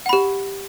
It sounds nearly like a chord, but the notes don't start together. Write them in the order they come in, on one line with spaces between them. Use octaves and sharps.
F#5 B5 G4